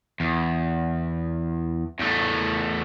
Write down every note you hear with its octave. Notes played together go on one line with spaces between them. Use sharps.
E2
E2 A3